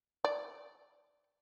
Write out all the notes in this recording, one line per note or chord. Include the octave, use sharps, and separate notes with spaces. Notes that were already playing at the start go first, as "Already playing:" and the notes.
D5